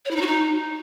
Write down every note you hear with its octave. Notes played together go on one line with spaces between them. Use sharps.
C#5
E4
D#4
F#4
D#4